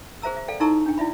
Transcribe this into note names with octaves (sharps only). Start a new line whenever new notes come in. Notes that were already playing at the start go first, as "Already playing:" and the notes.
G#4 C5 E5 A#5 E6
E5
A4 D5 F5 G5
D#4 E4 A4 A#5 C#6 E6
D4 G5
E4 D5 E5 B5